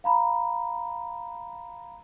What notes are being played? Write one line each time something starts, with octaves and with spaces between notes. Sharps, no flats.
F5 A#5 B5